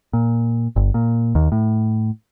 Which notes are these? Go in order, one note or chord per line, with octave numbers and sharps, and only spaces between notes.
A#2
G1
A#2
D#2
A2